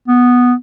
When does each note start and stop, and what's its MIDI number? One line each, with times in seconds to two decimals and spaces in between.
0.08 0.53 59